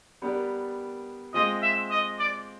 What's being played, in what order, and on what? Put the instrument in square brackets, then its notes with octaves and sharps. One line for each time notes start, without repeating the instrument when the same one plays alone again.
[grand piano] G3 B3 D4 G4 A#4
[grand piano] G#3 C4 F4 [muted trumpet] D#5
[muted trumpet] E5
D#5
D5